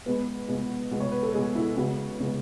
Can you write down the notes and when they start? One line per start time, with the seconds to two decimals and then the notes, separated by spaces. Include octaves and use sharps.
0.06 B2 G#3 B3 B4
0.48 B2 G#3 B3
0.91 B2 G#3 B3
1.00 C#5
1.12 B4
1.23 A4
1.34 B2 G#3 B3 G#4
1.55 E4
1.76 C#3 G#3 B3 F#4
2.20 C#3 G#3 B3